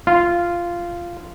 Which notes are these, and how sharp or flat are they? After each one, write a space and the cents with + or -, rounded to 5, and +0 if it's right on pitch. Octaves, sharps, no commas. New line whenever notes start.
F4 -10